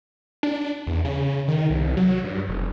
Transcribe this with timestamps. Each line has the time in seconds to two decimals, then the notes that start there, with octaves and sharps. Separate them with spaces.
0.43 D4
0.87 E2
1.05 C#3
1.48 D#3
1.70 C2
1.97 F#3
2.24 G2
2.49 F1